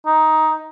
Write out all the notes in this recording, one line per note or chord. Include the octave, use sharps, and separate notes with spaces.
D#4